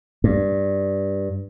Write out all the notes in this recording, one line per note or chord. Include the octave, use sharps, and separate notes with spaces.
G2